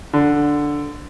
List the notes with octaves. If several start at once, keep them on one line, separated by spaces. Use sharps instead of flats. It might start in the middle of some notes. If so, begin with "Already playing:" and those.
D3